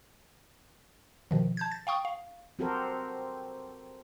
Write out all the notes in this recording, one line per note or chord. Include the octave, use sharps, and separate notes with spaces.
B2 D#3 F3
A5 G6 G#6
A6
F5 G5 C#6 D#6
F5
C4 F#4 G4 A4 A#4 C5